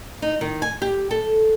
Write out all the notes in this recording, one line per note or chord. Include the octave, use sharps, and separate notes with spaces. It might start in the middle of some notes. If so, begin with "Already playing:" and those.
D#4
D#3
G#5
G4
A4